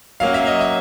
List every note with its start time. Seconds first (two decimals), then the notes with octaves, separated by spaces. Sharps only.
0.20 F#3 A#3 C#4 F5
0.34 E5
0.47 D#5
0.61 E5